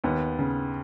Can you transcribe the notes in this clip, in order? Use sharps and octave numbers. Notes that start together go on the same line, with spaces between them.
D#2 B3
C#3